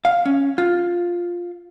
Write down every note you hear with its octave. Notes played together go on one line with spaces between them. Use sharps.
F5
C#4
F4